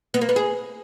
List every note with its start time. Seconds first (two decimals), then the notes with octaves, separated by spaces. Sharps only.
0.14 B3
0.21 A#3
0.29 B3
0.36 G#4